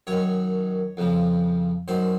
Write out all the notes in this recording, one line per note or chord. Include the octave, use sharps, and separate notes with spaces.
F#2 D#3 C#5
F2 C#3 F3
F#2 D#3 C5